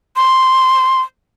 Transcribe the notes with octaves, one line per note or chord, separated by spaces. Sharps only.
C6